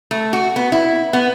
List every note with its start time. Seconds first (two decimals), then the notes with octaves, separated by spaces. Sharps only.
0.11 A3
0.33 F#4
0.56 B3
0.72 E4
1.13 B3